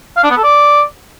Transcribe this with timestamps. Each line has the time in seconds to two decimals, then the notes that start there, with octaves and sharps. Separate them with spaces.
0.17 F5
0.24 D4
0.30 B3
0.37 A4
0.44 D5